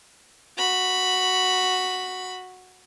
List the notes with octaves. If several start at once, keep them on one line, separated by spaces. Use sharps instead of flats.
F#4 B5